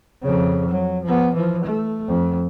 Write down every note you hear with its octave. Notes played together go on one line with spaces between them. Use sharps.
F2 C#3
F#3
F3 B3
E3 F3
A3
F2